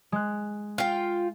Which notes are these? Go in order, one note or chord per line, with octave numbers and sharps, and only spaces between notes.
G#3 F#6
F4 G5